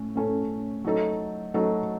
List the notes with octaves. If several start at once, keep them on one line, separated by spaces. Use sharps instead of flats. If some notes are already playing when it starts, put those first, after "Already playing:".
Already playing: A2 A3 C#4
A2 A3 C#4 A4
F#3 A3 D#4 A4
F#3 A3 D#4 A4